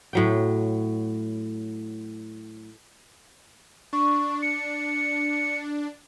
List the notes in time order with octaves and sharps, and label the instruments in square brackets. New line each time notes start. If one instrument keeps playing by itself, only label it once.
[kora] A2 F#3 G5
[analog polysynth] D4 [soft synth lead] C#6
[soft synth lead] C#7